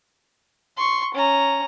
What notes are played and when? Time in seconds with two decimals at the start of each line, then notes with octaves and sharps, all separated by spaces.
0.77 C6 C#6
1.15 C#4 A#5